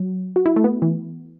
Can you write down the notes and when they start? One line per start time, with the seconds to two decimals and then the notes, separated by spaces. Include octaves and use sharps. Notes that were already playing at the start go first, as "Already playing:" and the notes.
Already playing: F#3
0.36 F#4
0.46 E4
0.56 A3
0.64 B3
0.82 E3